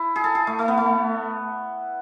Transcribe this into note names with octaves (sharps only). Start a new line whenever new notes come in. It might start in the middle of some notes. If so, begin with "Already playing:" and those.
Already playing: E4
G#4
A4
G#4
A3
A3
B3
A3